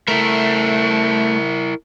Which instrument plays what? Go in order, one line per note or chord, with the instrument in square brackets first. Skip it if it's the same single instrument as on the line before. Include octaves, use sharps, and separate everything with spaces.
[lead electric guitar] A3 [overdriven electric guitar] E4 A#4